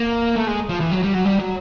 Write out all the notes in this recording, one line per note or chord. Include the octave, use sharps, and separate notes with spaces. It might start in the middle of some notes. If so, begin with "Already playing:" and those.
Already playing: A#3
A3
G#3
F3
E3
F#3
G3
F#3
G3
F#3